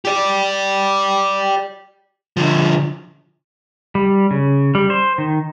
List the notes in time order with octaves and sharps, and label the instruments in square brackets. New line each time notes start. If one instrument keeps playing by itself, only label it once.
[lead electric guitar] G4 D5
D3 F3
[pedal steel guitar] G3
C#3
G3
C5
D#3